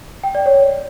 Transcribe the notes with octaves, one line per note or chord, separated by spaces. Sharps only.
G5
D5
C#5